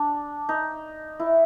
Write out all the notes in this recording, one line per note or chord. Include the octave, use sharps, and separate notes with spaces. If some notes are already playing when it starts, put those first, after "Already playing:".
Already playing: D4
D#4
E4